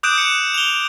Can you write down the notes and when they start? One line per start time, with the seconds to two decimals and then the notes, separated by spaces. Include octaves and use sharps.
0.03 D6 D#6 F#6 G6 D7 E7
0.18 C#7 E7
0.54 F7 G7